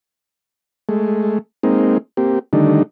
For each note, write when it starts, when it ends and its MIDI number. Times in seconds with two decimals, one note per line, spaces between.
0.89 1.39 56
0.89 1.39 57
1.63 1.98 56
1.63 1.98 58
1.63 1.98 60
1.63 1.98 63
2.17 2.39 58
2.17 2.39 60
2.17 2.39 67
2.53 2.83 50
2.53 2.83 51
2.53 2.83 55
2.53 2.83 57
2.53 2.83 62
2.53 2.83 63